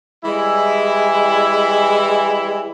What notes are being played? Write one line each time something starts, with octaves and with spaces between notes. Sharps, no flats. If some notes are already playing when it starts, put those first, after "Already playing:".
E3 G3 G#3 E4